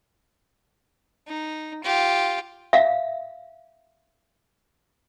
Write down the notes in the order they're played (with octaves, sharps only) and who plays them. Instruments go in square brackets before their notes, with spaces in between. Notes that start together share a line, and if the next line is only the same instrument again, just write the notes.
[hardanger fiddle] D#4
F4 G4
[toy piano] E5 F5